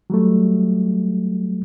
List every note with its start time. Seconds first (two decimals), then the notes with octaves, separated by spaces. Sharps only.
0.10 F#3 G3 A3